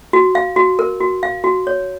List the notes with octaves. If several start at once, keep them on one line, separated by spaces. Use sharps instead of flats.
F#4
F5
F#4
A#4
F#4
F5
F#4
C#5